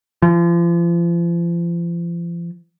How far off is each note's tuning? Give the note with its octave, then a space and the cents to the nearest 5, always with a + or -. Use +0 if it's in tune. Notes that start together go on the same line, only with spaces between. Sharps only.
F3 -40